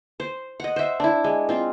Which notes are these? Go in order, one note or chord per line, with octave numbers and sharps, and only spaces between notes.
C5
D#5 F#5
C5 E5
D4 E4
G#3
C4 F4